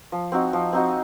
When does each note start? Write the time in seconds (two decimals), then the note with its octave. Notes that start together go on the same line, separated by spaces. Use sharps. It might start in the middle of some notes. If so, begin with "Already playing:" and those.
0.12 F3
0.32 C4 D#4 F#4
0.53 F3
0.73 C4 D#4 F#4